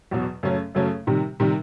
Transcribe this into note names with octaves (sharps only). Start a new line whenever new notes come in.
E2 B2 F#3
F#2 C#3 F#3 A3 C#4
F#2 C#3 F#3 A3 C#4
C3 D#3 G3
C3 D#3 G3